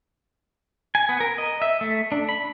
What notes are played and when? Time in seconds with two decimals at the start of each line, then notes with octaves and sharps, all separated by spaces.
0.95 G#5
1.09 B3
1.20 A#4
1.38 D#5
1.62 E5
1.81 A3
2.12 D4
2.29 B5